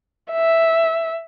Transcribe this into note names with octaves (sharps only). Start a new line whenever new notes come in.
E5